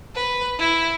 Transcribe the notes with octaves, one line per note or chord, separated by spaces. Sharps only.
B4
E4